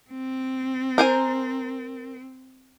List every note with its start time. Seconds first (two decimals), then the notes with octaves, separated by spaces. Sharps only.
0.11 C4
0.98 A#4 C5 G#5